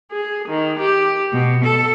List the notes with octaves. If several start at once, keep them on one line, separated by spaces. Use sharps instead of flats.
G#4
D#3
G4
B2
A4